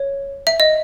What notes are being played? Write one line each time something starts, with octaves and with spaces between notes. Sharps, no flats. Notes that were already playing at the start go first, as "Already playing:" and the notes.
Already playing: C#5
E5
D#5